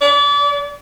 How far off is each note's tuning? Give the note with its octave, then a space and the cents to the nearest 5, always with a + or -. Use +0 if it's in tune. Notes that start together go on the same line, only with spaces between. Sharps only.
D5 -35